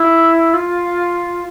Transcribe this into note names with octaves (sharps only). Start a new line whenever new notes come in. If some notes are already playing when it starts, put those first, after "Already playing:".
Already playing: E4
F4